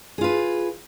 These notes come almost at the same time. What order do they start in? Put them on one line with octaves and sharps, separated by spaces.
G#4 F4 B4